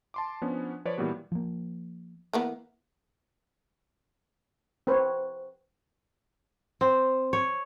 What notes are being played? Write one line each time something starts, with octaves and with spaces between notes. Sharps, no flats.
A5 C6 D6
F3 B3 C#4 D4
F3 B4 C#5 D5
A#2 E3 G3 B3 F#4
F3 A#3
E3 A#3 B3
C4 B4 C#5
C4
C#5